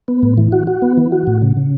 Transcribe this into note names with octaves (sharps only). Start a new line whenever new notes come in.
B3
A2
E3
F#4
F#4
B3
E3
F#4
A2
C#3
C#3